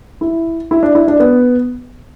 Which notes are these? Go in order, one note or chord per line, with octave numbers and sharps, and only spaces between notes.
E4
E4
D4
E4
D4
B3